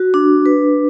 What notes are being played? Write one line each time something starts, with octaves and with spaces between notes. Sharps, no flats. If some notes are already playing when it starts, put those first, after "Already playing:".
Already playing: F#4
D4
B4